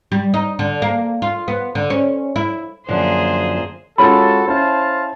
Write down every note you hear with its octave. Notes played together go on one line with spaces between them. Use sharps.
G3
D#4
D3
A#3
F4
B3
D3
C#4
E4
F#2 D3 F3 A#3 G#4 C5
G#3 C#4 F4 F#4 A4 B5
C#4 E4 C5 F5 A5